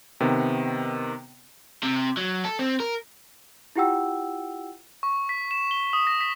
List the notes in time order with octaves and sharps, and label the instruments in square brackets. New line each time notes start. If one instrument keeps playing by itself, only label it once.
[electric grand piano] C3 D#3 B3
[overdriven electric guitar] C3
F#3
A4
C4
A#4
[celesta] E4 F4 G4 F#5 G5 E6
[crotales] C#6
B6
E7
G7
D#6
A#6
B6